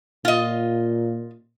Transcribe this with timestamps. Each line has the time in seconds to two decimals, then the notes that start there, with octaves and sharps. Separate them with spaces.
0.25 A#2 F4 D#5